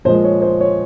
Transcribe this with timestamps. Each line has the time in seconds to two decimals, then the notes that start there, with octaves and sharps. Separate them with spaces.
0.05 A#2 F3 G#3 C5
0.24 C#5
0.42 C5
0.61 C#5